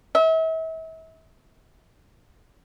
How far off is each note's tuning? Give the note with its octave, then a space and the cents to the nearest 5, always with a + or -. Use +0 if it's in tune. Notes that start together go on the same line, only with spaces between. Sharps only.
E5 -40